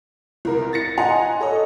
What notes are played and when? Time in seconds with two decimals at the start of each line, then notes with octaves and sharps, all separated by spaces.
0.45 C2 A#4
0.73 A6 A#6 C#7
0.98 D#5 F#5 G#5 A#5 C6
1.41 A4 C#5 D#5